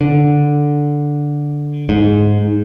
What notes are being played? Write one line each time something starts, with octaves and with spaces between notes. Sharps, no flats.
D3
G#2